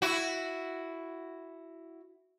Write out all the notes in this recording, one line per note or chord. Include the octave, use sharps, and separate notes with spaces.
E4 F#4